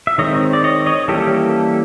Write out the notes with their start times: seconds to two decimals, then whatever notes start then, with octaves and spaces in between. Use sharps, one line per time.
0.07 E5
0.18 D#3 G#3 C4 C#5 D#5
0.53 D5
0.64 C#5 D#5
0.86 C#5 D#5
1.08 E3 G3 A#3 C#4 G4 A4